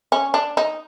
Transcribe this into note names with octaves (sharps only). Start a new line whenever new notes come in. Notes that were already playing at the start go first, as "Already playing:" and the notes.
C#4
D4
D#4